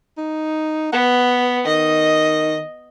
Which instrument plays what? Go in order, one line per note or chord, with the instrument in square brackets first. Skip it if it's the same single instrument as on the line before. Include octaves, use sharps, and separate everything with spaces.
[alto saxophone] D#4
[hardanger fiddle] B3 [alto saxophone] F#5
[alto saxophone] D#3 [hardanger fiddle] D#5